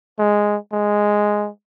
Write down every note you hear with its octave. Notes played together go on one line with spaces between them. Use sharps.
G#3
G#3